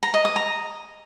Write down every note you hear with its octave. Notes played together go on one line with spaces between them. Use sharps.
A#5
D#5
D#6
A#5